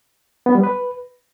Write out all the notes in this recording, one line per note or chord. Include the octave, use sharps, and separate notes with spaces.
B3
G3
B4